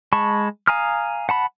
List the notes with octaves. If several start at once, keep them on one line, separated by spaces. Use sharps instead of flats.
G#3 A5 B5 C#6
F5 G#5 A#5 D#6 F6
F#5 A5 B5